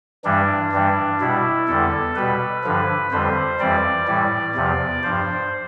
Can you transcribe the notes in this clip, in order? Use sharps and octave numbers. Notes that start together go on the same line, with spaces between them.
G2 E3 G3 D4
G2 E3 G3
B2 G3 E4
E2 D3 G3 A4
B2 G3 B4
G2 D3 F3
F2 D3 G3 C5
F2 E3 G3 D5
A2 E3 G3
E2 C3 F3
G2 F3 C5